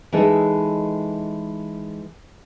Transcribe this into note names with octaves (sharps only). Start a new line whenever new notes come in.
E3 G#3 D#4 A4 D#5